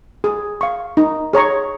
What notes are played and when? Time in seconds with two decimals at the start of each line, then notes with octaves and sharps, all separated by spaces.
0.24 G#4
0.61 F5 C#6
0.97 D#4
1.33 G#4 C#5 A#5 C#6